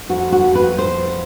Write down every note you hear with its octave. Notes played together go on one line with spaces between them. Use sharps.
F2 F#4
F#4
F2
B4
F2 C5